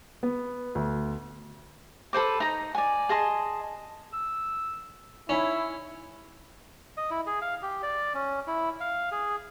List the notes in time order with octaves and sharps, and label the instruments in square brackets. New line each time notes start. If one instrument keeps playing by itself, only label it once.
[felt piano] B3
D2
[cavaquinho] A4 B4 C5 D6
D#4 A#5
D5 G#5
G#4 D#5 A5 C6
[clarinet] E6
[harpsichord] C#4 [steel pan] D#4 G#5 B5 [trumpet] E4 [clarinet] C#5
[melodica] D#5
E4
G#4
F5
G4
D5
C#4
E4
F5
G#4